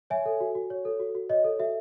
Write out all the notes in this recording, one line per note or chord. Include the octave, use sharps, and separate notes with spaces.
C#5 E5 G#5
A4
F#4
F#4
C#5
A4
F#4
F#4
C#5 D#5
A4
F#4 E5